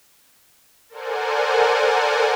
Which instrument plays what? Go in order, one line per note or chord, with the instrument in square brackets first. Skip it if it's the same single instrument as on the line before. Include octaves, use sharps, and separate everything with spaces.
[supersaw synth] A4 A#4 C5 D5 F#5 G#5